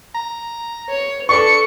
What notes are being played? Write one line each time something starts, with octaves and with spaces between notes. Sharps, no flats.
A#5
C#5
D4 A4 B4 C#6 C#7